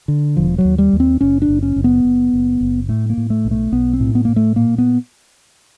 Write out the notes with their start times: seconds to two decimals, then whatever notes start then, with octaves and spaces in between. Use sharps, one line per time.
0.08 D3
0.37 E1 F3
0.58 F#3
0.65 D#2
0.78 G3
0.93 D#2
1.00 C4
1.21 F#1 C#4
1.42 D4
1.48 F#1
1.63 C#4
1.76 F#1
1.84 B3
2.05 F#1
2.33 F#1
2.61 F#1
2.89 A2 A3
3.10 A#3
3.17 A2
3.30 A3
3.45 B1
3.51 A3
3.72 B1 B3
3.93 C4
4.00 A2
4.15 B3
4.25 A2 A#3
4.36 A3
4.56 A#2 A#3
4.78 B3